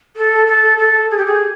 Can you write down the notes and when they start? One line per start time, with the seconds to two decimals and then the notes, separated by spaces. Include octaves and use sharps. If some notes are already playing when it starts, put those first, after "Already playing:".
0.16 A4
0.47 A4
0.78 A4
1.11 G#4
1.17 G4
1.26 G#4